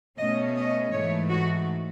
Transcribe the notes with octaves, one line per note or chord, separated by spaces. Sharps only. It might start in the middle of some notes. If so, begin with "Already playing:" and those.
B2 A3 C#4 D#5
D#5
G#2 E3 A3 C#5
F#4